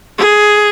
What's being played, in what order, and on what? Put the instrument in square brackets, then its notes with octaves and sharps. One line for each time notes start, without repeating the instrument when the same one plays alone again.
[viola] G#4